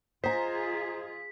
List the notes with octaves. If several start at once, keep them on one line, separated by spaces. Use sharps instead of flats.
F4 G#4 C5 D#5 G#5 A#5 B6